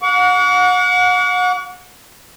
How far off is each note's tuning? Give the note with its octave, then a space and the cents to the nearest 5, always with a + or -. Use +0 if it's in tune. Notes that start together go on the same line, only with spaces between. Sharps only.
F#5 -35 C#6 +45